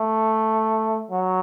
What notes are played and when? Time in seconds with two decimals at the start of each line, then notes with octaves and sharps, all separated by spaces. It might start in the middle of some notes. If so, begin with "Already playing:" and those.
Already playing: A3
1.11 F#3